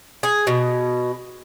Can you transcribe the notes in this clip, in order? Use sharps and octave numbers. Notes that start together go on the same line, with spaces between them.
G#4
B2